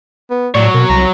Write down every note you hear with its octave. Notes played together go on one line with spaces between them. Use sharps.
B3
A2 F#3 C#5 D5
B2 A#4
C2 A#5